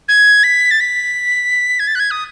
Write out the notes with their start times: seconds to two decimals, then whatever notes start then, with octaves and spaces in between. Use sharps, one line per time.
0.09 G#6
0.44 B6
0.71 A6
0.80 B6
1.80 G#6
1.87 A6
1.95 F#6
2.00 G#6
2.11 D#6